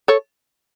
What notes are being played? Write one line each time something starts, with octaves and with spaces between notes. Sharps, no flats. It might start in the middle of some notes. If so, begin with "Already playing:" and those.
A4 C#5